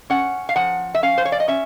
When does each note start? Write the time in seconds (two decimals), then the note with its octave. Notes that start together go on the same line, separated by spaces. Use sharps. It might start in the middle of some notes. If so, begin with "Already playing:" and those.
0.10 C#4 F#5
0.49 F5
0.56 F3 F#5
0.95 E5
1.03 C#4 F5
1.18 C5
1.25 C#5
1.32 D5
1.40 D#5
1.48 C#4 E5